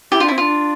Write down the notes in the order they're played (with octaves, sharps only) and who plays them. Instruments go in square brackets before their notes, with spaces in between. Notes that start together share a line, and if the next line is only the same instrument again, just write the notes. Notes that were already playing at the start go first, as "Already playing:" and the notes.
[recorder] E4 [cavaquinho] G4
[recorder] D4 [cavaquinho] F4
[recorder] C4 [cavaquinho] E4
[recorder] D4 [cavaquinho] F4